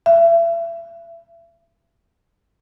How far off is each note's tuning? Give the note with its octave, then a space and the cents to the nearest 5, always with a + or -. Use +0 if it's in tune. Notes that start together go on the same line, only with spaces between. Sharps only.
E5 +35